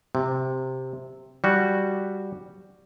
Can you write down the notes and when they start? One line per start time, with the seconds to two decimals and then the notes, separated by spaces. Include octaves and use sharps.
0.15 C3
1.44 G3 F#4